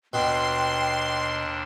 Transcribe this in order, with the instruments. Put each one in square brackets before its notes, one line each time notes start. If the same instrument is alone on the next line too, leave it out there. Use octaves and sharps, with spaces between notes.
[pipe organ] D#2 D4 [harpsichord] B2 [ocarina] G5 [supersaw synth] C6